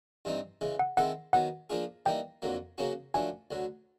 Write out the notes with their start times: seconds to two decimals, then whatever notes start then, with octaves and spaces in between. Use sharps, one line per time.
0.25 G2 E3 G3 C4 D#4
0.61 C#3 E3 G#3
0.79 F#5
0.97 D#3 G#3 C4 E4 A4 F#5
1.33 D#3 F#3 B3 F#5
1.70 F3 A#3 D4 F4 G#4
2.06 E3 G3 A#3 D#4 G5
2.42 F2 D3 F#3 A#3
2.78 C#3 F#3 A#3 C#4 F#4
3.14 F#2 D3 F3 A3 D4 G#5
3.51 D2 D3 F#3